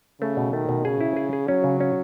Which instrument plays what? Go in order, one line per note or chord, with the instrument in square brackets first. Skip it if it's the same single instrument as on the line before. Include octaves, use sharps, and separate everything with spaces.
[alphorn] C#3 [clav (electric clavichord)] A3
[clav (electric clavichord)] B2
[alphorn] D#3 [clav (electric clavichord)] A3
[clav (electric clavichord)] B2
[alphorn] C#3 [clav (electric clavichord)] G#4
[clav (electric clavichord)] E4
G#4
G#4
[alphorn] F#3 [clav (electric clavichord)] C#4
[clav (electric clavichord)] C#3
C#4